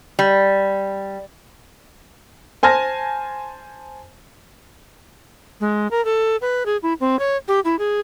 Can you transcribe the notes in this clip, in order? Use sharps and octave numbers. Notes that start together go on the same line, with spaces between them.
G3
C5 G#5 A5 F6 A#6
G#3
A#4
A4
B4
G#4
E4
C4
C#5
G4
E4
G#4